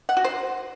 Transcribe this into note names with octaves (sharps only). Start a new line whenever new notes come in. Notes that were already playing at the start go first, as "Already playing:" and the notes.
F#5
F#4
C5